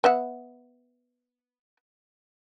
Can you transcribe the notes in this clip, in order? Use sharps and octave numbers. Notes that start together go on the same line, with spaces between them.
B3 E5 F#5